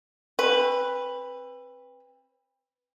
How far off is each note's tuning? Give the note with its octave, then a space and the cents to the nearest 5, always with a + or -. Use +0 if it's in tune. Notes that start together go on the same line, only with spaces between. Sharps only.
C4 +30 B4 +0